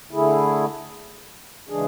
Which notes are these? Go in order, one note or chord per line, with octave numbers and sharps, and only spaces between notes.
D3 A3 E4 G#4
C#3 E3 G#3 D4 G#4